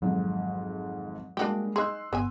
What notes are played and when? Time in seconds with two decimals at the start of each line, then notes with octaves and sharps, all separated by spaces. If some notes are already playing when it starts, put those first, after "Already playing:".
0.02 G#1 F2 G#2 F#3
1.37 G3 G#3 A#3 D4 F#4 G4
1.76 D#4 G#4 C6 E6 F#6
2.13 G1 B3 E5 G#5